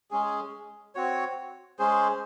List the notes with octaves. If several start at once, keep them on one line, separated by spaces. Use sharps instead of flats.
G#3 C#4 G#4
C4 F#4 C#5
G#3 C#4 G#4 C5